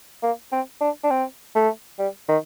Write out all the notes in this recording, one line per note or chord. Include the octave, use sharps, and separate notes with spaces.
A#3
C4
D4
D4
C4
A3
G3
D#3